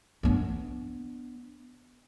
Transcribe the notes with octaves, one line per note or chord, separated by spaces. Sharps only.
B3 D4